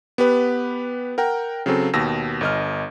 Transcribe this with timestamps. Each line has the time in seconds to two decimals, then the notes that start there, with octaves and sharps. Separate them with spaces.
0.18 B3 G4 B4
1.18 A#4 F#5 G5 A#5
1.66 C#3 F#3 C4 A4
1.94 D#2 B2 E6 A#6
2.41 G1 D#5 F6